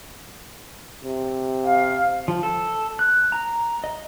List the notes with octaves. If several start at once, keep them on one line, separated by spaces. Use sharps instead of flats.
C3
F5
F3
A4
F#6
A#5
D#5